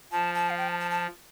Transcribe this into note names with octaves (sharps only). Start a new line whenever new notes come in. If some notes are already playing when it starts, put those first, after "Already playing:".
F3 A5
A5
F5
G5
A5
A5
A5